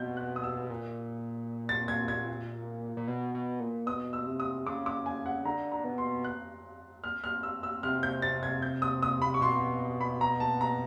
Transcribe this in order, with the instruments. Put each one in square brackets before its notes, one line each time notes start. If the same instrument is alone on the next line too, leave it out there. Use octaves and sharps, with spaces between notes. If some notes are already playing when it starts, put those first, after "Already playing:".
Already playing: [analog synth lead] B2 [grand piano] G6
[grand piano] F#6
D#6
E6
[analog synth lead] A#2
[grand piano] A6
G#6
G#6
[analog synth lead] A#2
B2
B2
A#2
[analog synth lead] B2 [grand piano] D#6
[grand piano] E6
[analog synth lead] C3
[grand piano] D#6
[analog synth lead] C#3 [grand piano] D6
[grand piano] D6
G#5
F#5
[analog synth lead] D3 [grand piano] A#5
[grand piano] A#5
[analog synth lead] B2
[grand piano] C6
F#6
F6
F6
E6
E6
[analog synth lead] C3 [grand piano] F6
[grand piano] G6
A6
G#6
G6
D#6
D#6
B5
C#6
[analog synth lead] B2 [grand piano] C6
[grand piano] B5
A#5
A5
A#5